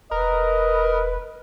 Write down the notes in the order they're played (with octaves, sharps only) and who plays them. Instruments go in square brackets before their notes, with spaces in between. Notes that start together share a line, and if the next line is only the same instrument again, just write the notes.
[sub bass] E1 [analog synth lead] A#4 [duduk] B4 [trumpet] D#5